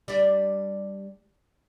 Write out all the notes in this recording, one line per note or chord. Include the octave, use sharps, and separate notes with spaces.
G3 D4